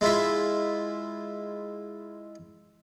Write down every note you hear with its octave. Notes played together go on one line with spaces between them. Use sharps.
G#3 E4 F4 E5